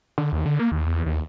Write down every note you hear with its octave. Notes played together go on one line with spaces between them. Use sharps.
D3
D#2
D3
A#3
D#2
E2
D#2